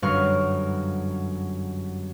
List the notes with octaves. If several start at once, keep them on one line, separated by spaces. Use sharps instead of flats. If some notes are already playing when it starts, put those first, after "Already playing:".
G1 F#2 B4 F5 C#6 F6